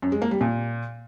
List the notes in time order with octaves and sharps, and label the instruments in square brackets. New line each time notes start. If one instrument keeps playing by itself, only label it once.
[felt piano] F#2
G#3
A#3
G3
A#2